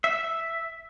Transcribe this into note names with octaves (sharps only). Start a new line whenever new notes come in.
E5